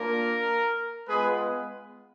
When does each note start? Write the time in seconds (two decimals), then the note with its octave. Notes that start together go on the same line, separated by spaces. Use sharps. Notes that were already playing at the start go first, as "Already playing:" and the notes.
Already playing: A#3 D4 F4 A#4
1.08 G#3 B3 F4 G#4 B4